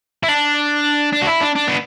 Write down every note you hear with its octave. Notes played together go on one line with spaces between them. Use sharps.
E4
D4
D4
F#4
E4
D4
D4
B3